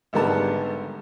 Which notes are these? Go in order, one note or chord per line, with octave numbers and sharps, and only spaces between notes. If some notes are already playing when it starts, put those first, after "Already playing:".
G#1 D3 G3 B3 A#4 A5